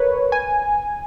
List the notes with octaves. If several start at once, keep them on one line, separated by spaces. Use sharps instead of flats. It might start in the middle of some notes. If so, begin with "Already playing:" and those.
Already playing: A#4 B4 C#5
G#5